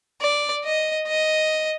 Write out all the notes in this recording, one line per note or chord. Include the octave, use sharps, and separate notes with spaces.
D5
D#5
D#5